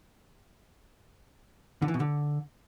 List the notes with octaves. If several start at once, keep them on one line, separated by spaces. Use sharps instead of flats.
D3
E3
B2
D3